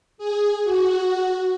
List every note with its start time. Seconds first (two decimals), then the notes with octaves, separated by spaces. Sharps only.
0.18 G#4
0.64 F#4